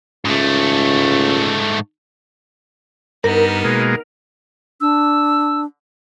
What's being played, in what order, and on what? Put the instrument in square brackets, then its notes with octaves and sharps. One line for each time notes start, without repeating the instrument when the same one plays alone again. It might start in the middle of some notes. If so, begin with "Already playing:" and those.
[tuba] C#2 [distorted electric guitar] G#2 A3
[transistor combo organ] G2 [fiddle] B3 D#4 [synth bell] A#4
[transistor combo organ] B2 G#3 A#3
[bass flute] D4 [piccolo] E6